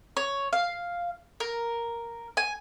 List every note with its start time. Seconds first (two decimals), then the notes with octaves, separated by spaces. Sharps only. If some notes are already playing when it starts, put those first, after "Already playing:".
0.17 C#5
0.53 F5
1.40 A#4
2.37 G#5